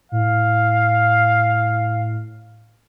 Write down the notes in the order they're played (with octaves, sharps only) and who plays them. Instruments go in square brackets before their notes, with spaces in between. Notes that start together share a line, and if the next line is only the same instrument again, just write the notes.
[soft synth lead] A2 [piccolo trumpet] F5